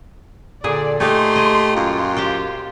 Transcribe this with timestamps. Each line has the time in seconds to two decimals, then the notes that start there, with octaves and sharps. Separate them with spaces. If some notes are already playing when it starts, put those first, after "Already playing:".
0.64 A#2 D3 G#4 D5
1.00 A3 A#3 D#4 G4 G#5 C6
1.36 D#5 G#5
1.76 F#2 F4
2.16 G4 C5 G5